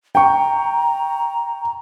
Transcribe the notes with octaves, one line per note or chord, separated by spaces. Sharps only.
G5 A#5 C#6